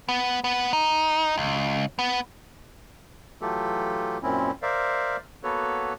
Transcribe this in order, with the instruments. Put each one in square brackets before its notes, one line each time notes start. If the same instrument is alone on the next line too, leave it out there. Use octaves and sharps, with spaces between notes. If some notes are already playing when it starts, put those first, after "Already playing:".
[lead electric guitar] B3
B3
D#4
C#2
B3
[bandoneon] E3 F#3 A3 F4 G4 A4
F#2 A#2 C4 C#4 E4
A#4 C5 D5 E5 F5
A#3 B3 F#4 A4 B4 C#5